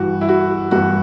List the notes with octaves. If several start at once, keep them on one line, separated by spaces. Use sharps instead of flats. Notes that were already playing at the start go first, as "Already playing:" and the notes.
Already playing: G2 E3 G3 F#4
E4
F#4
G2 E3 G3 F#4